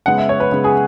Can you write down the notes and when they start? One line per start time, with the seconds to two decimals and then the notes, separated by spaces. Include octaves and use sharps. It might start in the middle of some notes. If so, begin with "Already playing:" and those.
0.06 C#3 G#3 B3 F#5
0.18 E5
0.29 C#5
0.40 B4
0.52 C#3 G#3 B3
0.64 G#4